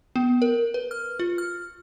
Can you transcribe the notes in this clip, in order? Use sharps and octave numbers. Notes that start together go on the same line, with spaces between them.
B3
A#4
B4
F6
F4
F6